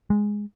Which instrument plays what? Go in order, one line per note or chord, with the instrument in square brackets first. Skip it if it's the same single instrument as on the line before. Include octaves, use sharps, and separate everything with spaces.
[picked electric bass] G#3